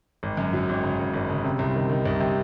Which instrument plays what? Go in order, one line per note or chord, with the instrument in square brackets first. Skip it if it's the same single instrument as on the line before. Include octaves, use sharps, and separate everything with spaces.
[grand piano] G#1
F#2
F#3
G#1
C#3
G#1
G#1
C#3
C3
C2
D#3
D#3
C2
C3